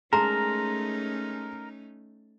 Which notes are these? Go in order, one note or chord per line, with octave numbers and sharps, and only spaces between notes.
G#3 A3 C#4 D#4 A#4 A5 A#5 C6